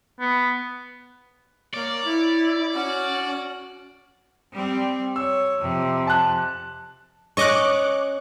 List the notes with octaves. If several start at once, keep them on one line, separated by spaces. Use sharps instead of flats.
B3
A#3 C#5 D5
E4
C#4 F#4 F#5
G3 C4
C#5 E6
F2 C3
A5 F#6
C#4 D#5 C#6 D6 F#6